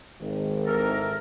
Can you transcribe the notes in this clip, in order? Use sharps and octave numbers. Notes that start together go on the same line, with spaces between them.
G#1
E3 A4 A#4